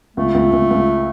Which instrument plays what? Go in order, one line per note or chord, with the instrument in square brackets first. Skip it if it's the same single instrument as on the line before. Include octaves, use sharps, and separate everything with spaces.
[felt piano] C#2 [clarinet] A3
[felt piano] C#2
C#2
C#2